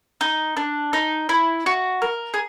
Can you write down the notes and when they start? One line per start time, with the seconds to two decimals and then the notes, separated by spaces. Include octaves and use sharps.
0.21 D#4
0.57 D4
0.93 D#4
1.29 E4
1.66 F#4
2.02 A#4
2.34 G#4